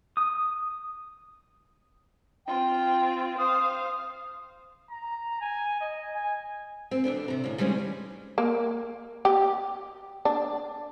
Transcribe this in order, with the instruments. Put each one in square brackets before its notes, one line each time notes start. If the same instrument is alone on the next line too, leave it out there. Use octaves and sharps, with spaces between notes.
[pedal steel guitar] D#6
[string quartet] C4 F4 [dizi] G5
[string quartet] C5 F5 [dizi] D#6
[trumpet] A#5
G#5
D#5
G#5
[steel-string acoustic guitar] C4
E2 B2 D4 A4
C3 A#5
A2 C#3
B2 D#3 G3 G#3 C4 C#4
[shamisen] A#3
G4
D4